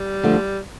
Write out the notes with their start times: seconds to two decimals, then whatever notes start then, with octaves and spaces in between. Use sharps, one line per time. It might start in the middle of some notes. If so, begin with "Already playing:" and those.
Already playing: G3
0.23 D3 F3 A3 D4